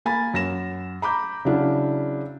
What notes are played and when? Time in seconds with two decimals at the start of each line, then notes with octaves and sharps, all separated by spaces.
0.05 A#3 G#5 B5 A6
0.34 F#2 A#6 E7
1.02 A#5 B5 D6 G6
1.45 C#3 F#3 D4 E4